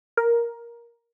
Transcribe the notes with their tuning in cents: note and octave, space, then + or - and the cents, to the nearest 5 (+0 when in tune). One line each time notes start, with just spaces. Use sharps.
A#4 +10